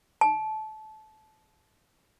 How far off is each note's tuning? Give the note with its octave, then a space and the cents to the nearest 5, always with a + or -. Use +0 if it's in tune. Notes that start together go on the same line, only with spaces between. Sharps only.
A5 -25